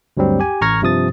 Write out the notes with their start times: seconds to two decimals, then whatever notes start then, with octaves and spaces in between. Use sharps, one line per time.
0.17 D2 G2 F#3 G3 C4
0.40 G4 G#5
0.61 A1 A#5 C#6 F6 G#6 A#6
0.82 G2 C3 F3 D#6 A6